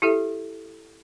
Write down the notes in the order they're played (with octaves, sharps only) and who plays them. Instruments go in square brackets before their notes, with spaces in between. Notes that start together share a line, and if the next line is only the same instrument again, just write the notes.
[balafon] E4 G4 A4 E5